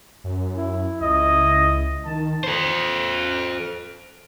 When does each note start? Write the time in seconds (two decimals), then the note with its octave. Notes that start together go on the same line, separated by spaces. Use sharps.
0.24 F#2
0.56 E4
1.01 C#2 D#5
2.05 D#3 A5
2.44 A4 C5